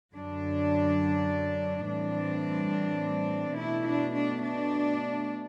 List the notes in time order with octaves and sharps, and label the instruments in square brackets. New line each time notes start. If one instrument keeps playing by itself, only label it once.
[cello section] F#2 D3 F#3 D4
A2 E3 G3 C4 D4
B2 A3 D4 E4
D4
D4
D4